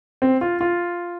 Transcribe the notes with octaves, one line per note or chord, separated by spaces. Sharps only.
C4
F4
F4